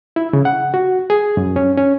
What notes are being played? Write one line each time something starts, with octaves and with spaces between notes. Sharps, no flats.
E4
C#3
F#5
F#4
G#4
F#2
C#4
C#4